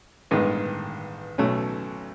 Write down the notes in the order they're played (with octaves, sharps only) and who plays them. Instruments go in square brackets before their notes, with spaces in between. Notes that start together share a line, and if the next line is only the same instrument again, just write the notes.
[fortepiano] A1 G2 D#3 G#3 B3
B1 B2 F#3 A3 C#4